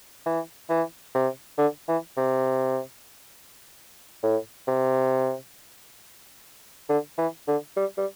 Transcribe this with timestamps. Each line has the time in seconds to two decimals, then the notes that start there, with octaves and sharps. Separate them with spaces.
0.26 E3
0.70 E3
1.15 C3
1.58 D3
1.88 E3
2.18 C3
4.24 A2
4.68 C3
6.89 D3
7.18 E3
7.48 D3
7.77 G3
7.98 G3